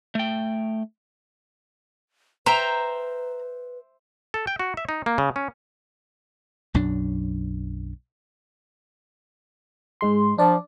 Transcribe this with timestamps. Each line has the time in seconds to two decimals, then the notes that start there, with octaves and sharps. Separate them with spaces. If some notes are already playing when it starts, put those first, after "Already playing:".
0.15 A3 G5
2.46 B4 C5 E5 G5 A#5
4.34 A4
4.47 G5
4.59 F#4
4.77 E5
4.89 D#4
5.06 A#3
5.18 C#3
5.36 C#4
6.74 B1 F#2 F#3 D4
10.01 G#2 G#3 C6
10.38 F3 D4 D5